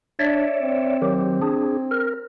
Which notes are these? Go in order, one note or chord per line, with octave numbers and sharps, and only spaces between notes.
D4 C#5 D5 E5
C4
D#3 F#3 G4
D4 G#4
A#4